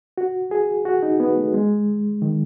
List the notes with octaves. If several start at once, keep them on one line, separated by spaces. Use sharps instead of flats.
F#4
G#4
F#4
D#4
B3
A3
G#3
D#3